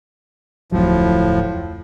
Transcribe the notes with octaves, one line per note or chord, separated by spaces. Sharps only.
D1 F2 A2 F3 F#3